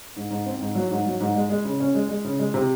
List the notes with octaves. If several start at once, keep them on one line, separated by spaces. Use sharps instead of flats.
G#2
G#2
C4
G#2
F#3
G#2
F#3
G#2
G#3
G#3
C#3
C#4
G#3
G#3
C#3
G#3
C3